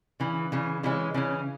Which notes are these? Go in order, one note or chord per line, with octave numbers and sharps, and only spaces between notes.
C#3 E3
C#3 E3
C#3 E3 G#3 C#4
C#3 E3 C#4